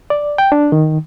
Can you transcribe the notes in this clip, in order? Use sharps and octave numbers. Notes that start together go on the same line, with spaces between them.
D5
G5
D4
D#3